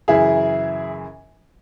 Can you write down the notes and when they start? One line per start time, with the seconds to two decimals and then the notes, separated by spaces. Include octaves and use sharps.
0.08 F#2 C#3 E3 E4 G#4